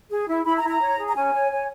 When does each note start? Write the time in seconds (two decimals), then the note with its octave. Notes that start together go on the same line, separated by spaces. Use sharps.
0.10 G#4
0.28 E4
0.45 E4 B5
0.57 A#5
0.64 E4
0.69 A#5
0.81 C#5
0.98 G#4
1.08 A#5
1.15 C#4 G#5
1.33 C#5
1.51 C#5